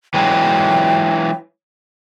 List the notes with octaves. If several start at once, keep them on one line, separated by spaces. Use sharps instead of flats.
E3 F#3 G#3 G5